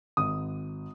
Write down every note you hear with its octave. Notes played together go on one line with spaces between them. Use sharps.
G#1 D#6